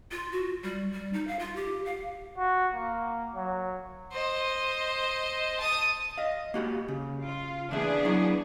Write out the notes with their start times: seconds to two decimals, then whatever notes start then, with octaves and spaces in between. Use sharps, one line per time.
0.11 F4
0.32 F#4
0.63 G3
0.93 G3
1.13 D#4
1.27 F5
1.39 F4
1.55 G4
1.85 F5
2.37 F#4
2.73 A#3
3.35 F#3
4.12 C5 D#5
5.60 A5 D#6
6.18 D#5 F5
6.54 A#3 F#4 G4
6.88 C#3
7.23 F4
7.71 E2 B3 D4 G#4 E5
8.05 F#3 E4